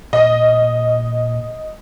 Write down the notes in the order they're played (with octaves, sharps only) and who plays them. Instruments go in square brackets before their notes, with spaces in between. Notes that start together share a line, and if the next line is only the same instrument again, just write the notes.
[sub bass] A#2 [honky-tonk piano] D#5